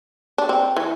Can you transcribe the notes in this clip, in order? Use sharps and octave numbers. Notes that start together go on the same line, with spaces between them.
D4
C4
E3